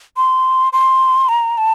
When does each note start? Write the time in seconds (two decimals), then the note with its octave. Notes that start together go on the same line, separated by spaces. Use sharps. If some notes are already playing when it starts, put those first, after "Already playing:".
0.17 C6
0.73 C6
1.29 A#5
1.58 A5